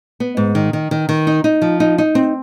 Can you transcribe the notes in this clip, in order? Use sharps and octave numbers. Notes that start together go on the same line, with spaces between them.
B3
G#2
D#3
D#3
D#3
D#3
D#4
D#4
F3
D#4
D#4
C4